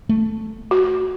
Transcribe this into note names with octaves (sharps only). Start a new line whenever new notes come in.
A3
F#4